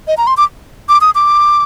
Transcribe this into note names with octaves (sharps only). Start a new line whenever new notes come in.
D#5
A#5
C6
D6
D6
D#6
D6